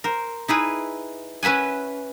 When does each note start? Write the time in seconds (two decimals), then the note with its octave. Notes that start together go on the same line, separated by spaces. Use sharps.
0.04 A#4 C5
0.48 D#4 E4 G#4 B4
1.43 C#4 B4 E5 F#5 G#5